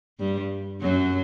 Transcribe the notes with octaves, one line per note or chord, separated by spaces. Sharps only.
G2 G3
F#2 F#3